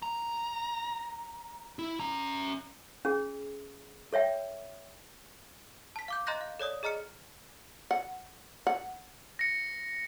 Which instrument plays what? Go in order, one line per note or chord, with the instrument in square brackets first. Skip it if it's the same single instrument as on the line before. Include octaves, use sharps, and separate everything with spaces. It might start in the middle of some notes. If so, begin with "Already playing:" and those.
[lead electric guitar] A#5
E4
C#4 A#5
[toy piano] C#4 G#4
A4 C#5 E5 G5
[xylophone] A5 B6
F5 D6 G6
D#5 A#5 C6 F#6 G6 A#6
F5
A4 C#5 D5 D#6
G#4 D#5 A#5 F6 C#7
[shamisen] F#5
F#5
[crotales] A#6 C#7